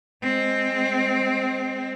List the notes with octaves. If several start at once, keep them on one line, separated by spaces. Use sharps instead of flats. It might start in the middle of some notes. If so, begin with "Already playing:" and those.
G#3 C4